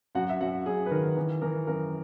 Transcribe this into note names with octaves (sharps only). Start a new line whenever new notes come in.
F#2 F#4 F#5
E5
F#2 F#4 F#5
F#2 G#4
B4
D#3 A#4
E3
E3 A#4
F#2 A#4